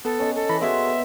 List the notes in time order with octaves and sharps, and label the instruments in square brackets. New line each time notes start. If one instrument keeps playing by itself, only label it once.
[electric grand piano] B3 [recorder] A4
[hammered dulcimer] C#4 D#5
[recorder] A4
[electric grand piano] E3 B5 A#6
[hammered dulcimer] B3 C6 [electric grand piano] F#4 G#4 A4 [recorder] E5